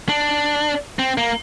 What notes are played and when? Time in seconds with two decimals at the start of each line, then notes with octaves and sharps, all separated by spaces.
0.09 D4
0.99 C4
1.18 A#3